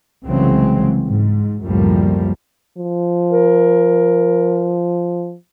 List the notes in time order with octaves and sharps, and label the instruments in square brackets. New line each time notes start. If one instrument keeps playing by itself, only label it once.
[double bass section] C2 C#3 E3 F#3 G#3 C4
G#2
C#2 F#2 A2 F3 G3 A#3
[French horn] F3
[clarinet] A#4